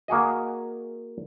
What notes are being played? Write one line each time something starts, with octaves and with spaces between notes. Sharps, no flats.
A#3 F#4 G#4 D#5